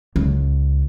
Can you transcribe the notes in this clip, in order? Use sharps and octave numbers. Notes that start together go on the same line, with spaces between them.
C#2